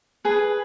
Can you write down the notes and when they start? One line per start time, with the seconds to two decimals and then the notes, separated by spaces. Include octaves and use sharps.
0.25 G#4 B4